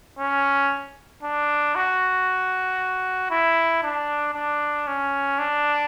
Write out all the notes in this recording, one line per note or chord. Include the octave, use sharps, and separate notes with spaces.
C#4
D4
F#4
E4
D4
D4
C#4
D4